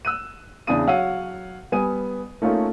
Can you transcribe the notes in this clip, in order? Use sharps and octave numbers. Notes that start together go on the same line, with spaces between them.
E6 F#6 D#7
E2 C#3 D4 E4 D#6 D#7
F#3 C#5 F5 F#5 E6 D#7
G3 B3 G#5 D#6 D#7
A3 A#3 C#4 D#4 F4 A4